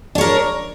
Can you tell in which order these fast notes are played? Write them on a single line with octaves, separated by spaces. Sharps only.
D4 C#5 A#4